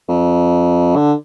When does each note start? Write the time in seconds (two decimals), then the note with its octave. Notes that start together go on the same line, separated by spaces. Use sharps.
0.09 F2
0.96 D3